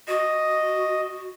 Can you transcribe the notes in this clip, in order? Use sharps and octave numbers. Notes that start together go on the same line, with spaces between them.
F#4 D#5